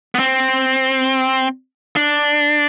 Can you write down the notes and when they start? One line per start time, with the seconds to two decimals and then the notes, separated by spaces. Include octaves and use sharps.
0.15 B3
0.19 C4
1.96 D4